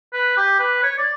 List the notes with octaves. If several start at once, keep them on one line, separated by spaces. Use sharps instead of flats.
B4
G4
B4
C#5
D5